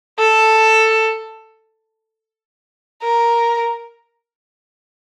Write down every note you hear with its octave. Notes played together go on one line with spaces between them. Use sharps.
A4
A#4